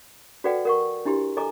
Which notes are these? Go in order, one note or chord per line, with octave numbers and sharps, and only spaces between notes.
F#4 A4 B4 D5 F#5 G5
A#4 F#5 C#6
D4 E4 G4 C6
A4 D#5 G#5 A#5 D6